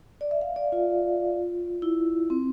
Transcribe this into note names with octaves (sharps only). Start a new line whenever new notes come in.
D5
E5
F5
D5
F4
E4
C4